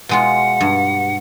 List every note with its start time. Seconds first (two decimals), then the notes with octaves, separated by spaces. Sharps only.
0.09 B2 G#3 F4 F#5
0.61 G2